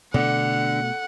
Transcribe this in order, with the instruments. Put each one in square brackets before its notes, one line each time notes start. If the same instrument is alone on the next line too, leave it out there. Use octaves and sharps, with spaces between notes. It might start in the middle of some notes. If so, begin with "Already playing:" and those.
[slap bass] B2 A3 [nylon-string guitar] D3 [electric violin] F#5